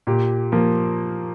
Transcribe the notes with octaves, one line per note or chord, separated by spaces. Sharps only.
A#2 G4
F3 A#3